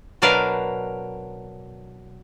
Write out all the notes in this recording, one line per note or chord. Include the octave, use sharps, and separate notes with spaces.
B2 F#3 D4 A#4 B4 F5